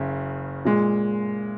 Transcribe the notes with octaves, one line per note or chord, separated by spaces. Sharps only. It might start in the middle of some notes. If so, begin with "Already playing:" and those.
Already playing: F#1 C#3
A#2 G#3